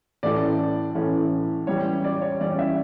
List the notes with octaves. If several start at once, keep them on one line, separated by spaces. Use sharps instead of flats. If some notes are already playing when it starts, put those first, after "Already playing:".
A2 E3 A3 C#4 D5
A2 E3 A3 C#4
E3 G3 C#4 C#5
D5
C#5
E3 G3 C#4 D5
E5